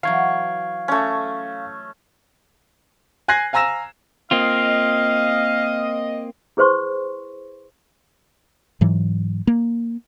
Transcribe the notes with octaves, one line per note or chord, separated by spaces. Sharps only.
E3 F#3 F5 C#6 G#6
A3 C#4
G#5 F#6 G#6 A#6 C7
F5 G#5 A#5 E6 A#6 E7
A#3 C4 F4 D#5 F5
E4 G#4 B4 C5 C6 C#6
G#2 E3 F#3
A#3